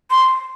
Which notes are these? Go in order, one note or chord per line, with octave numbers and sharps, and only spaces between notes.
C6